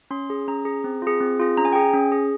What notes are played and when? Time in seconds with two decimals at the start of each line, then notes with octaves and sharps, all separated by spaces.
0.11 C#4 C6
0.30 G#4
0.48 C#4 A#5
0.65 G#4
0.84 C4
1.02 F4 G#4
1.20 C4
1.40 F4 G#4
1.57 C#4 A#5
1.65 G#5
1.72 G5
1.75 G#4 G#5
1.94 C#4
2.12 G#4